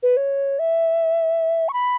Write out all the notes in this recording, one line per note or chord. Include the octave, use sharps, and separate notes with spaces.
B4
C#5
E5
C#6
B5